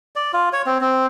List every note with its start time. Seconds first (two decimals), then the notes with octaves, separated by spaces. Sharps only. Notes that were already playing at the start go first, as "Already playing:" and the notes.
0.16 D5
0.33 F4
0.53 C#5
0.66 C4
0.81 C4